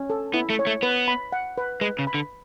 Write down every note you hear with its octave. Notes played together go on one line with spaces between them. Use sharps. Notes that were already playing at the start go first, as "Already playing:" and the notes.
Already playing: C#4
A4
B3 E4
A3
C#5
A3
B3 B4
B5
F#5
B4
G#3 B4
C#3
B5
D3